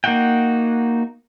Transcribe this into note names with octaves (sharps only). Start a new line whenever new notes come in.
A#3 D#4 F#4 F#5 G5